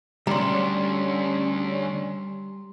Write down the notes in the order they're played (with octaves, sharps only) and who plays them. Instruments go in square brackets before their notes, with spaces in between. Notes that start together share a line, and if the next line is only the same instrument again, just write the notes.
[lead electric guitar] D2 [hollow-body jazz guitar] G3 [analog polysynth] C#4 D4 [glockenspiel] A#5 C6